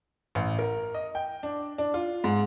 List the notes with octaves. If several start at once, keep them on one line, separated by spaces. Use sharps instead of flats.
A1
A#4
D#5
G5
D4
D4
F4
G#2